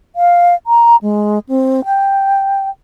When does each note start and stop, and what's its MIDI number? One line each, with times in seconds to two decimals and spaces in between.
0.16 0.54 77
0.67 0.96 82
1.02 1.39 56
1.49 1.85 60
1.85 2.69 79